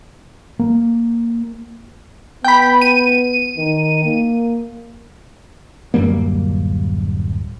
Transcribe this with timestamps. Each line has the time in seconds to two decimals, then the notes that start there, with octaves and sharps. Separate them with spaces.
0.59 A#3
2.44 B3 G5 B5
2.82 D#7
3.58 D#3
4.05 A#3
5.94 D1 F#2 G3 A#3